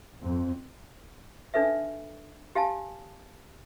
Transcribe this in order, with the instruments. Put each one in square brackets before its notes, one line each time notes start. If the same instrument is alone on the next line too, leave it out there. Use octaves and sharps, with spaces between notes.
[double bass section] F2
[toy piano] D4 D#4 A4 B4 E5
G4 F5 G#5 A5